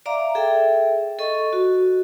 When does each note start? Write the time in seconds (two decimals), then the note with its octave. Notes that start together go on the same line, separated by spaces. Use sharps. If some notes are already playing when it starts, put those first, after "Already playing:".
0.06 D5 E5 F5 A#5 D6
0.35 G#4 A4 E5 G5
1.19 A4 D#5 C#6
1.53 F#4